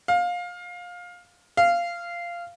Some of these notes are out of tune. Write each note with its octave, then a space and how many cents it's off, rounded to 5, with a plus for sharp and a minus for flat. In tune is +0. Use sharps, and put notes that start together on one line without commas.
F5 +20
F5 -15